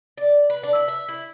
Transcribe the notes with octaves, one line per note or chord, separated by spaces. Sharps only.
D5
B4
D4
E4
E5
E4